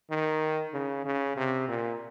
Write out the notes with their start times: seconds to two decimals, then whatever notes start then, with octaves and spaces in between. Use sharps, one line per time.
0.11 D#3
0.74 C#3
1.06 C#3
1.37 C3
1.69 A#2